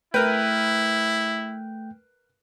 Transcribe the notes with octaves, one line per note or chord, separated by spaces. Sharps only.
A3 E4 A#4 B4 G5 G6